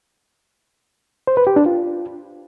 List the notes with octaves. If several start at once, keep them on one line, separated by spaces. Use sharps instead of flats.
C5
B4
G4
D4
F4